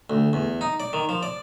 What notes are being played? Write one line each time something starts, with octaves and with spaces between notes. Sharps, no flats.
D2
E2
D#4
D5
D#3
F3
D5